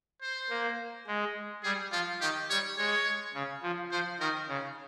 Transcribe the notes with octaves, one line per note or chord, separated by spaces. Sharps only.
C5
A#3
G#3
G3 G#4
F3 F4
D#3 G4
G3 C#5
G#3 C#5
C#3
F3
F3 C5
D#3 A#4
C#3